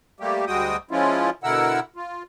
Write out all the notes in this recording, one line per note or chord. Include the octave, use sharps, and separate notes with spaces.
G3 A3 A#3 G4
D2 G3 G#3 F#4 G5 D#6
F3 G#3 C#4 E4 F4
B2 D3 E4 A#4 F#5 E6
F4